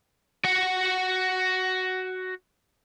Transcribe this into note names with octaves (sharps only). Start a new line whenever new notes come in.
F#4 F#5